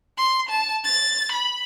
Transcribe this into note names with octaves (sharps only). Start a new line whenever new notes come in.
C6
A5
A6
B5